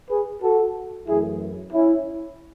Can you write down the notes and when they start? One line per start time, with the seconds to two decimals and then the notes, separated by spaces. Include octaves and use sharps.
0.10 G#4 B4
0.42 F#4 A4
1.07 F#2 E3 A3 E4 G#4
1.73 C#4 E4